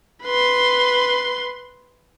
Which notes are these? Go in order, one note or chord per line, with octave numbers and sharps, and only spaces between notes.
B4 C6